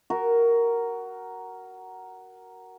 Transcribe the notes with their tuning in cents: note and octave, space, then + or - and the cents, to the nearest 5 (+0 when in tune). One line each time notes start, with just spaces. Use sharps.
F#4 +15 A#4 +0